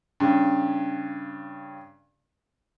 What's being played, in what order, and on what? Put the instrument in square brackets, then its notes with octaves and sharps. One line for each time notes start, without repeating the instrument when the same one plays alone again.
[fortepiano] G2 C#3